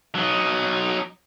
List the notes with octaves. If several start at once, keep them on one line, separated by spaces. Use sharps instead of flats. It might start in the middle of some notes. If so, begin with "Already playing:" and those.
F#3 D#4